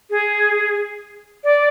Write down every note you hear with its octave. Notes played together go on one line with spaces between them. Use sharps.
G#4
D5